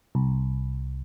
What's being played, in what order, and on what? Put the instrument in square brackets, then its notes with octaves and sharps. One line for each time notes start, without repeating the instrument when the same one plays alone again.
[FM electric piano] C2